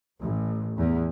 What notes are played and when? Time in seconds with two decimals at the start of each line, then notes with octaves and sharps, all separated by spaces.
0.20 A1
0.77 E2